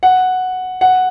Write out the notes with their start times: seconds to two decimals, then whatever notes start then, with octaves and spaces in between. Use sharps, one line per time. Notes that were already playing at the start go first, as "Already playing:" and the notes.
0.03 F#5
0.81 F#5